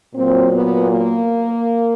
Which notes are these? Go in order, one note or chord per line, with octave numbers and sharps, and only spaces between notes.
A#2 F#3 C4
B3
A#3